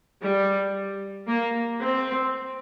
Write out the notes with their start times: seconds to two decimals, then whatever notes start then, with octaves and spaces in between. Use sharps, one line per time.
0.22 G3
1.27 A#3
1.80 C4